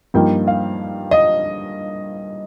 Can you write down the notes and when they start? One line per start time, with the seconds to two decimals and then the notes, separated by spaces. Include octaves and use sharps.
0.14 G2 F3 A#3 D#4 G5
0.47 F5
1.11 D#5